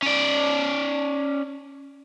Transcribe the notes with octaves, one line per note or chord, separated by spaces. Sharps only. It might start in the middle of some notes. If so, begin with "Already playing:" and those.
C#4 D5